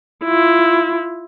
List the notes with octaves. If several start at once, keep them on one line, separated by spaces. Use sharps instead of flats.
E4 F4